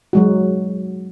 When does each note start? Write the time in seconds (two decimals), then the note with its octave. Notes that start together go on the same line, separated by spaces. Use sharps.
0.13 F#3 G#3 F#4